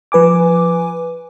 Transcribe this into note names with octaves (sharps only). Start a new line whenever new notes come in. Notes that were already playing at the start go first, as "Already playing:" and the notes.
F3 B4 G#5 D6